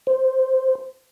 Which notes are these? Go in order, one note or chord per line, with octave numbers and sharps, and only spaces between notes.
C5